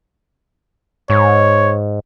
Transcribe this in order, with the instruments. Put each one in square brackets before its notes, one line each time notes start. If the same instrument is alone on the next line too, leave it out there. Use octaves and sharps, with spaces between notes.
[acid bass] G#2 [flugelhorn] C#5